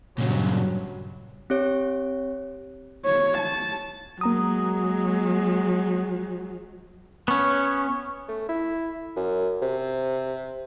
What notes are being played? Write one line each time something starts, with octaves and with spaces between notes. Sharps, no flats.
G2 A#2 C#3 F#3
C4 G4 C#5
C#5
A5
F#3 G#3 A#3 A#5 D#6
B3 C#4 C#6
A3
E4
F#2
C3